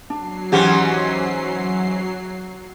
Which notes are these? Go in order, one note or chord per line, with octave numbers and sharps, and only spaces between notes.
F#3 D4 C7
G#2 E3 C#4 G4 F#5